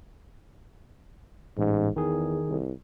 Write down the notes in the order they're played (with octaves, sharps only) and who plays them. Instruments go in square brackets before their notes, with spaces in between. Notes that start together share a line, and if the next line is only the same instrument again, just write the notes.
[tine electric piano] A1 [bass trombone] G#2
[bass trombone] E2 [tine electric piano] D#3 G#4
[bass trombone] C2